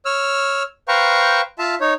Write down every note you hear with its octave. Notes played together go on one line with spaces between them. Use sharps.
C#5 E6 F6
B4 C5 F5 G5 A#5 C#6
F4 E5 F5 A5
D#4 C#5